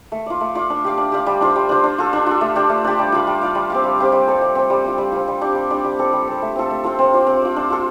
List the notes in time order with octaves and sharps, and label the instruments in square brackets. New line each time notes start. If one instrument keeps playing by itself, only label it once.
[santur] A3
F4 D5
A3
F4 D5
D4
G4 D5 F5
D4
G4 D5 F5
G3
D4 F4 C5
G3
D4 F4 C5
D4
F4 A4
D4
F4 A4
A3
D4 G4
A3
D4 G4
G3
F4 D5 F5
G3
F4 D5 F5
G3
C4 G4 F5
G3
C4 G4 F5
G3
C4 A4
G3
C4 A4
G3
C4 F4
G3
C4 F4
G3
D4 G4 D5
G3
D4 G4 D5
G3
C4 A4
G3
C4 A4
A3
C4 F4 A4
A3
C4 F4 A4
C4
F4 D5
C4
F4 D5
D4
F4 A4